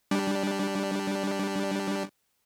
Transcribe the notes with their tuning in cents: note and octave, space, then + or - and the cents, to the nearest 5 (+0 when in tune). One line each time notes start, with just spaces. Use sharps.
G3 +0 D4 -5